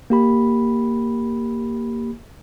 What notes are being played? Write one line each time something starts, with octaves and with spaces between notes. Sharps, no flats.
A#3 G4 B5